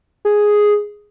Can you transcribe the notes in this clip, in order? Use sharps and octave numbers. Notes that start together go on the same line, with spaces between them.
G#4